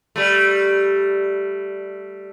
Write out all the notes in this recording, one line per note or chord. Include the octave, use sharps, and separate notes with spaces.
G3 A3